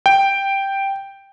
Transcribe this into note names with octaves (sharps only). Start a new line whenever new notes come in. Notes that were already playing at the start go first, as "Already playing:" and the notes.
G5